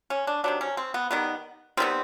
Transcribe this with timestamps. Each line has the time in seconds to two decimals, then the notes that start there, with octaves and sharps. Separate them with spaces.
0.10 C#4
0.27 D4
0.44 C3 D#3 F#3 D4
0.61 C#4
0.77 C4
0.94 B3
1.11 D#3 G3 B3
1.77 D#3 G3 B3 C4